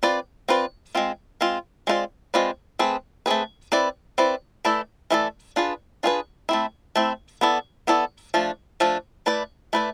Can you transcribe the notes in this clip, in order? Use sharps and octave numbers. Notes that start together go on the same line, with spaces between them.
C4 F4 B4 D5
C4 F4 B4 D5
G#3 C4 F4
G#3 C4 F4
G#3 C4 F4 B4 D5
G#3 C4 F4 B4 D5
A3 C4 G#4 B4
A3 C4 G#4 B4
C4 E4 B4 D5
C4 E4 B4 D5
E3 A3 E4 A4 D5
E3 A3 E4 A4 D5
D4 F4 G#4 B4
D4 F4 G#4 B4
A3 C4 E4
A3 C4 E4
B3 E4 A4 D5
B3 E4 A4 D5
F3 A3 D4
F3 A3 D4
A3 E4 B4 D5
A3 E4 B4 D5